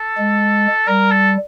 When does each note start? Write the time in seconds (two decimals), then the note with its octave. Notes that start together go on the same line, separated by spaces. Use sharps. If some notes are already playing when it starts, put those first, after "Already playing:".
Already playing: A4
0.18 G#3
0.88 G3 A#4
1.12 A4